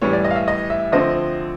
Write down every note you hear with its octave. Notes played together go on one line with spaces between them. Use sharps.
A2 E3 G3 C#5
D5
D#5
F5
E5
D#5
E5
D3 F3 A3 C4 D#5